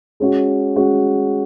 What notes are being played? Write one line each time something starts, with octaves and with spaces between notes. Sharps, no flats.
G#3 C#4 F#4
G#3 C#4 F#4